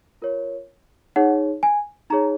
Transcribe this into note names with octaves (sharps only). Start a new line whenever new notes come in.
F4 A#4 C#5
D#4 G#4 C#5 F#5
G#5
D#4 G#4 C#5 A#5